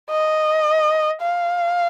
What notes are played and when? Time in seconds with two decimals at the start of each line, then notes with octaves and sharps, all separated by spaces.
0.10 D#5
1.22 F5